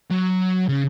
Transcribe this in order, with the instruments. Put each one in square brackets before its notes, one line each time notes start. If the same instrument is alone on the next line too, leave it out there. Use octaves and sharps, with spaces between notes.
[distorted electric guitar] F#3
C#3